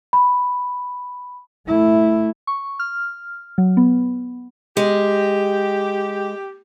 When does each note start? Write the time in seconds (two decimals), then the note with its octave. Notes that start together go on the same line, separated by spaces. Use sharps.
0.13 B5
1.67 A3 E4
2.47 C#6
2.79 F6
3.58 F#3
3.77 B3
4.77 G#3 G4